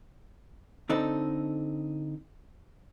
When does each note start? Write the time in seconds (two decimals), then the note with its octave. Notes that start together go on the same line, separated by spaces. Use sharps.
0.89 D3 C4 D#4 A4